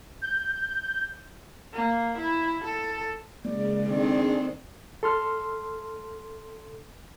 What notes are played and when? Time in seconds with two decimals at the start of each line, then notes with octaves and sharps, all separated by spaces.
0.22 G6
1.73 A#3
2.18 E4
2.64 A4
3.45 C#3 G#3 A#3 D5
3.87 D#3 C4 D4 G#4 A4
5.03 A4 C6 F6